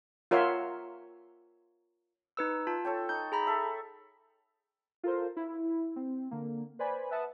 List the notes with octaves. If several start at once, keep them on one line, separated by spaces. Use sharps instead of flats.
F4 A#4 C#5 E5 F#5 C6
D#4 B4 E6
F4 A5
A4 C#5 G5
D#4 G6
G#4 A#5 B5
A4 E5 A5
F4 A4 A#4 C5
E4
C4
D3 A#3
B4 C5 D5 G#5 B5
B4 E5 F#5 A5 D#6